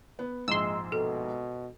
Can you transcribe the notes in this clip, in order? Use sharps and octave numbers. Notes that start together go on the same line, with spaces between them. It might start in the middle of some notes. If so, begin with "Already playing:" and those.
B3
A#1 G#2 G#3 C6 E6
B2 A4